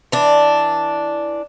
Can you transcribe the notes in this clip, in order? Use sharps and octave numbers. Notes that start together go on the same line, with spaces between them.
E3 D4